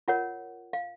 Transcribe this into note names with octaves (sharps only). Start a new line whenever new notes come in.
F4 A#4 C#5 F#5
F5